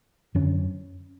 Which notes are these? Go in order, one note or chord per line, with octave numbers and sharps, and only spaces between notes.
F#2 D3 C#4